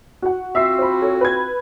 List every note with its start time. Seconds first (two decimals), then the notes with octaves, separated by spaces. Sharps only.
0.22 F#4 F#5
0.55 C4 F4 F#4 E5 E6 C7
0.78 C5 B5
1.02 A4 C#5
1.21 B4 G#6